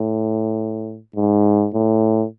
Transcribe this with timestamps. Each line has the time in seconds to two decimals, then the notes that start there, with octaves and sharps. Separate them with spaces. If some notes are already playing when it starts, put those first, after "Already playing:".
Already playing: A2
1.16 G#2
1.74 A2